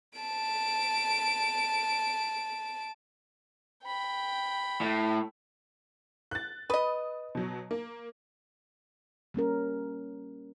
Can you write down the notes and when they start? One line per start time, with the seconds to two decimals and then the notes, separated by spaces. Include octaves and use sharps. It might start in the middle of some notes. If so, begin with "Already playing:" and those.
0.19 A5 D7
3.85 G5 B5
4.81 A2
6.31 F#6 A6
6.70 B4 D#5 D#6
7.35 B2 F#3
7.71 A#3
9.34 G3 A#3 C#4 A#4